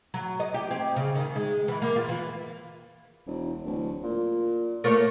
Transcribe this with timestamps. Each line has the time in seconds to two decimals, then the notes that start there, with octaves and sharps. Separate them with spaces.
0.14 F#3
0.40 D#5
0.54 G4
0.71 C4
0.96 C#3
1.15 D#3
1.36 G#3
1.68 E3
1.82 A#3
1.96 F4
2.09 E3
3.27 E1
3.65 D1
4.03 A#2
4.84 A3 A#3 C#5